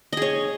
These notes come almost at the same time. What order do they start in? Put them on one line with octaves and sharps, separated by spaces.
D#5 G#4 C#5